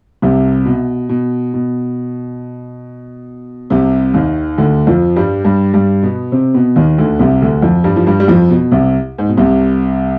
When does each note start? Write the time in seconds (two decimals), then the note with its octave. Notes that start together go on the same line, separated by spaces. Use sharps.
0.22 C2 C3
0.65 B2
1.09 B2
1.54 B2
3.70 C2 C3
4.14 D#2 D#3
4.58 D2 D3
4.87 F2 F3
5.16 G2 G3
5.45 G2 G3
5.74 G2 G3
6.03 B2 B3
6.32 C3 C4
6.54 B2 B3
6.76 D#2 D#3
6.98 D2 D3
7.19 C2 C3
7.42 D2 D3
7.62 F2 F3
7.84 G2 G3
7.96 F3
8.07 G2 G3
8.20 G3
8.28 F2 F3
8.50 B2
8.72 C2 C3
9.18 G#2
9.28 B2
9.37 C2 C3